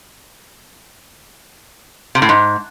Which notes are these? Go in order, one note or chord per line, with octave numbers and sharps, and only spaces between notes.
C3
A2
G#2